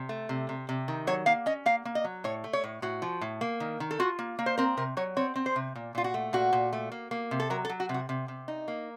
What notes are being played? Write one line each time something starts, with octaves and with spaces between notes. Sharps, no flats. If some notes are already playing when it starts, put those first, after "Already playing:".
Already playing: C3
A3
C3
C3
C3
D#3
F#3 C#5
A#3 F5
C#4 D#5
A#3 F5
A#3
D#5
F#3
A2 C#5
A3
C#5
A2
A2 F#4
F3
A2
A#3
D#3
D#3
A4
F4 F#4
A#3
A#3
C5
C4 A#4
C3 A#4
F#3 C#5
C4 C#5
C4
C5
C3
A#2
A#2 F4
F#4
A3
A#2 F#4
A#2
A3
A#3
A#3
C3
A4
F#3 A#4
A4
F#3
F#4
C3
F#4
C3
C3
D#4
A#3